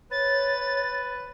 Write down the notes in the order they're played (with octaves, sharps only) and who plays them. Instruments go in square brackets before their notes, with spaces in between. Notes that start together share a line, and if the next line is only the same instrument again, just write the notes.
[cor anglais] B4 [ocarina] C#5 [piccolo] A6